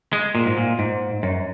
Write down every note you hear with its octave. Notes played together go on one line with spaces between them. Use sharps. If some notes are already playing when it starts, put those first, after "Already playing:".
G#3
A#2
G#2
A#2
G#2
F#2